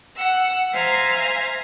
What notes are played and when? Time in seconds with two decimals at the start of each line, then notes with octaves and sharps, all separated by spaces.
0.15 F#5 E6
0.73 C5 E5 F5 G#5 A#5 F6